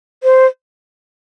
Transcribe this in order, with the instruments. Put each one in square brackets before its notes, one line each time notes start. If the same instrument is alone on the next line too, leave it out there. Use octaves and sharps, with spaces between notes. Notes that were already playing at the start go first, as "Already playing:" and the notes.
[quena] C5